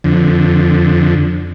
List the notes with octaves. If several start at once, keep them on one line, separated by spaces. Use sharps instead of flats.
F2 D3